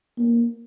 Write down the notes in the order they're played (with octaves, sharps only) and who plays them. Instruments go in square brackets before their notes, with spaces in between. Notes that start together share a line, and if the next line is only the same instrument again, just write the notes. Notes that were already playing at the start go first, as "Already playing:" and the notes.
[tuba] A#3